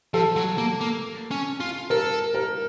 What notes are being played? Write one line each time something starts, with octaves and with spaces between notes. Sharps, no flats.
F3 A4
F#3
A#3
A#3
C#4
F4
A4 A#4
A#4